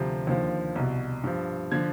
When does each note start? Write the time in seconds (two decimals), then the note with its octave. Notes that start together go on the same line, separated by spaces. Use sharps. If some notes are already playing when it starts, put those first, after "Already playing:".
Already playing: D2 C3 F3
0.27 D#2 D3 F3
0.75 C2 B2
1.24 G2 F3
1.71 D3 F3 G#6